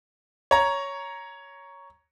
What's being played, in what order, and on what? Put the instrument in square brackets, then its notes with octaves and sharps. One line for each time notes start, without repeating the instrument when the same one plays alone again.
[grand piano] C#5 A#5